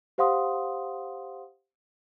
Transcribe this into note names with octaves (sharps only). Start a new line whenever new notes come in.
G4 C5 F5 F#5 C6 D#6